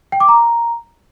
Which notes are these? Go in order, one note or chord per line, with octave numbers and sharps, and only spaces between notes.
G5
D6
A#5